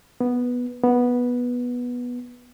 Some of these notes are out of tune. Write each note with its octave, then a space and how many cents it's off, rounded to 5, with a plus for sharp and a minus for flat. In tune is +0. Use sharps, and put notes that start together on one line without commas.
B3 -5
B3 -10